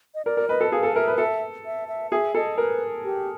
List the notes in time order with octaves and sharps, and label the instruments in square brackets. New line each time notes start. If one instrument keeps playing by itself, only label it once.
[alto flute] D#5
[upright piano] A#4 [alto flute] D5
[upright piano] A#4
[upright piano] B4 [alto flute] D#5
[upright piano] A4
[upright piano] G#4 [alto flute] F5
[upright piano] A4
[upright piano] A#4 [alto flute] E5
[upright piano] B4
[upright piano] A4 [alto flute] E5
[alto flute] E5
E5
[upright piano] G#4 [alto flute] E5
[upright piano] A4 [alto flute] D#5
[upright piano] A#4 [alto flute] B4
[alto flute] G4